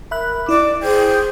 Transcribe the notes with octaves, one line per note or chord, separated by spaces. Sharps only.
A#4 E5 B5 F#6
E4 D5 D6
G#4 C5 G5